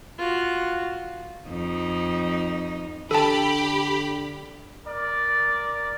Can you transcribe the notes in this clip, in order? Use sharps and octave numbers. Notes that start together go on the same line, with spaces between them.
F4 F#4
F2 D#4
D3 G4 A4 A5 B5
A#4 D5